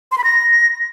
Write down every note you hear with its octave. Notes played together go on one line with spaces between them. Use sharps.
C6
B5
A#6